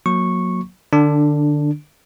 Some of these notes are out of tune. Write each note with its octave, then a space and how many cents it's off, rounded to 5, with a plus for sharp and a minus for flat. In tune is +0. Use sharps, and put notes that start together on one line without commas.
F#3 -25 A#3 +0 C#6 -10
D3 +25 D4 +0